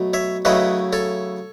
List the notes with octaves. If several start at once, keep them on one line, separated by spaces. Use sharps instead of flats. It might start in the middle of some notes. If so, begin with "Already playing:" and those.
Already playing: B2 F#3 A3
C#5 E5
C#3 F#3 A3 E4 B4 D#5
A4 C#5